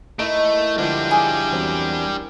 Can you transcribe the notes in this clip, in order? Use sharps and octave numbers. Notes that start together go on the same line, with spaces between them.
A3 D#4 E4 A#4 D7
D3 F3 G3 G#3 D4
G#4
E2 F#3 C4